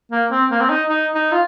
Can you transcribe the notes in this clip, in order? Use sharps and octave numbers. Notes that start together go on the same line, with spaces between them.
A#3
C4
A#3
C4
D#4
D#4
D#4
F4